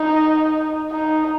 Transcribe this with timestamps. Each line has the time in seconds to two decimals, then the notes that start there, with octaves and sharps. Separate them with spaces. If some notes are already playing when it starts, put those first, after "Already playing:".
Already playing: D#4
0.91 D#4